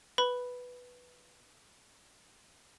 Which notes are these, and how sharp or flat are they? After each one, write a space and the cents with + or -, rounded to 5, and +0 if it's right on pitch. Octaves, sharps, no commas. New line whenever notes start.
B4 +0 B5 +0